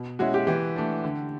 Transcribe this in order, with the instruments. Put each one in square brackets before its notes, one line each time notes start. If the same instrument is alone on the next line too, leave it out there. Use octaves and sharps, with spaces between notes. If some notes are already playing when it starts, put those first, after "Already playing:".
Already playing: [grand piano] B2
[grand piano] G#3 C#4 E4 [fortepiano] F#4
[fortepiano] G4
[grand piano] E3 [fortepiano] G4
[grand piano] A3 D4
D3